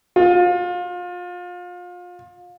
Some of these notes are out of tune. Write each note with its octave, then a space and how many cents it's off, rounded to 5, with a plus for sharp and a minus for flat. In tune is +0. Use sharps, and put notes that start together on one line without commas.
F4 +30